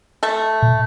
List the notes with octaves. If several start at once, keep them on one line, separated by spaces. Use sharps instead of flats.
A3 A4
A#2